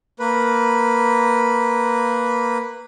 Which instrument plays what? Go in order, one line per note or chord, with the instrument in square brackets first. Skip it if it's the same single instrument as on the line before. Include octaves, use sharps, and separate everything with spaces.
[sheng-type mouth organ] A#3 B4